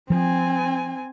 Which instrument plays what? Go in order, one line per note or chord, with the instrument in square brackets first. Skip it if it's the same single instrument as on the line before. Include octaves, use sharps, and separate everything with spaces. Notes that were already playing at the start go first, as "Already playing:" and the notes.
[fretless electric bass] F3 [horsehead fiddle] C4 G#5